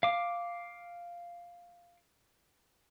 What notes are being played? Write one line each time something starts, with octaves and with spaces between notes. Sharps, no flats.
F5 D6